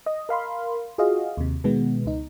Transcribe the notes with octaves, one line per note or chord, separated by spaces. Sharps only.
D#5
A#4 F5 B5 C6
F4 F#4 G#4 D#5 F5
D#2 C3
B2 D#3 G#3 B3
C#2 D#4